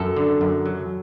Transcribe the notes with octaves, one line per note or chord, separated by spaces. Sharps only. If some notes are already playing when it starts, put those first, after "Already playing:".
Already playing: F#2 A4
D3
F#2
F#3